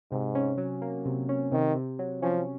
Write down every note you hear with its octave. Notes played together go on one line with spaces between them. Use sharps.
G#2 C3
C#4
F#3
A#3
C3
C#4
C3 D#3
C3
F#3
F3 C#4